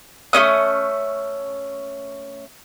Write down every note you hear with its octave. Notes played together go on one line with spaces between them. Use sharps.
A3 A#3 C#4 D#6